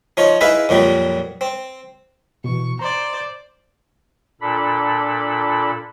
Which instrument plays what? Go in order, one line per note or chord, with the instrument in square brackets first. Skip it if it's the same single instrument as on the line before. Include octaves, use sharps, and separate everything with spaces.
[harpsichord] F3 D#4 F4 C#5
D#4 E4 G#4 B4 E5 F5
F2 A#2 F#3 G3
C4
[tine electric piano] B2 E3 [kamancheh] C#6
[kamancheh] C5 D5 [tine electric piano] A#5 C6
[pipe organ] A#2 D4 A4 B5